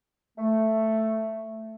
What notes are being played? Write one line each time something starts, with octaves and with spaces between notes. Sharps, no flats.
A3